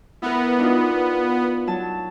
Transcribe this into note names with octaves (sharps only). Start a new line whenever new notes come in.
B3 E4 A#4
D4 D#4 F4
F#3 A5